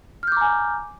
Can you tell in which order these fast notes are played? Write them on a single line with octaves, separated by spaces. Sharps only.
F6 G6 D6 A#5 G#5